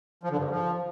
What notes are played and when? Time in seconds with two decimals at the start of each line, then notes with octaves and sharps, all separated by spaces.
0.23 F3
0.30 D3
0.37 G2
0.44 G#2
0.51 F3